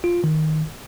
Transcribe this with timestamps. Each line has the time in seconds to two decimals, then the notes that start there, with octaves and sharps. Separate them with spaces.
0.04 F4
0.24 D#3